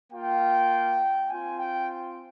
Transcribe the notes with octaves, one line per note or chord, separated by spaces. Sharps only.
A#3 F4 G5
C4 F4 G#5
G5